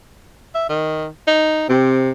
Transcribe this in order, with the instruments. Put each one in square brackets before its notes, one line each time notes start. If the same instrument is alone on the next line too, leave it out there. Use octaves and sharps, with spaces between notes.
[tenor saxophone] E5
D#3
D#4
[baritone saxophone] C3 [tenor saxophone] C4